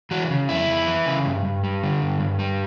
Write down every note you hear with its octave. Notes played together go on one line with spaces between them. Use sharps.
E3 F#4
C#3
F2 E4
F2
E3
C#3
G2
G2
G3
D3
G2
G2
G3